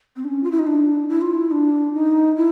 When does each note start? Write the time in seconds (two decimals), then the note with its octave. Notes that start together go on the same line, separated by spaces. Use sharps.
0.16 C4
0.24 D4
0.28 C#4
0.43 F4
0.51 E4
0.59 D#4
0.67 D4
1.09 E4
1.21 F4
1.34 E4
1.51 D4
1.94 D#4
2.36 E4